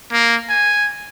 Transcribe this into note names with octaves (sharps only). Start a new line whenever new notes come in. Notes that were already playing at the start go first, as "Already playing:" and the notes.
A#3
G#5